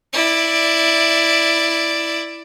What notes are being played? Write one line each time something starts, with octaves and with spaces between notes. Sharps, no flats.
E4 D5